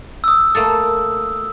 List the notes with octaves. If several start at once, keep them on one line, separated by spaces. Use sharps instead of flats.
D#6 E6
A3 A#3 A4